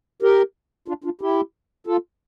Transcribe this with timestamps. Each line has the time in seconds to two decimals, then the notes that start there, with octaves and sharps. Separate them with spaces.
0.22 G4 A#4
0.88 D4 F4
1.04 D4 F4
1.21 E4 G4
1.87 F4 A4